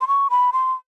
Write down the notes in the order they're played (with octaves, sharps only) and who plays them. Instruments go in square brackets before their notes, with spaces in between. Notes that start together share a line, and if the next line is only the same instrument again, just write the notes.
[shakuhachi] C6
C#6
B5
C6